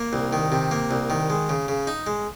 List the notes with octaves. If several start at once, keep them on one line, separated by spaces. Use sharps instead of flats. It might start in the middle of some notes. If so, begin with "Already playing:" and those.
Already playing: A#3
C2
D#3
C3
A#3
C2
D#3
G#3
C#3
C#3
D#4
G#3